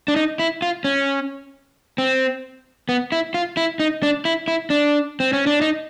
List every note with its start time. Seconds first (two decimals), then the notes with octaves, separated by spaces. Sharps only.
0.08 D4
0.16 D#4
0.39 E4
0.62 F4
0.85 C#4
1.98 C4
2.89 B3
3.12 E4
3.34 F4
3.57 E4
3.80 D#4
4.03 D4
4.25 E4
4.48 E4
4.70 D4
5.20 C4
5.33 C#4
5.47 D4
5.61 D#4